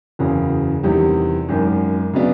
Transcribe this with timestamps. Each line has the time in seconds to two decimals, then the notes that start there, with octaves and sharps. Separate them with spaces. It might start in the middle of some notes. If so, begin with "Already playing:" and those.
0.19 F#1 E2 C#3 F#3
0.84 E2 C3 D#3 G3
1.49 G#1 F#2 D#3
2.13 C#3 F#3 B3 D4